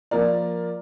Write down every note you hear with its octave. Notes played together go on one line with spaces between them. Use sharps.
F3 A#3 F4 A#4 D5